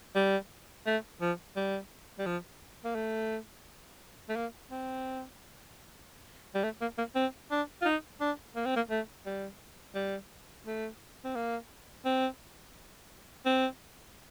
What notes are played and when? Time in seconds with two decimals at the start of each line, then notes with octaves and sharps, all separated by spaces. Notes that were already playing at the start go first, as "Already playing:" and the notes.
0.15 G3
0.86 A3
1.21 F3
1.56 G3
2.19 G3
2.26 F3
2.84 A#3
2.95 A3
4.29 A3
4.36 A#3
4.70 C4
6.54 G3
6.63 A3
6.81 A#3
6.98 A#3
7.15 C4
7.51 D4
7.82 F4
7.85 D#4
8.21 D4
8.56 A#3
8.65 C4
8.76 A#3
8.90 A3
9.26 G3
9.95 G3
10.66 A3
11.24 C4
11.35 A#3
12.05 C4
13.45 C4